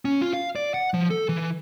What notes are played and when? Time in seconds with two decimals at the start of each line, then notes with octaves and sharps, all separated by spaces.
0.05 C#4
0.21 F4
0.33 F5
0.55 D5
0.74 F#5
0.94 F3
1.10 A4
1.29 E3